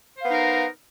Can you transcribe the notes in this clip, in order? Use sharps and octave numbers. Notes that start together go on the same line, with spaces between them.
B3 D#4 A#4 C5 F5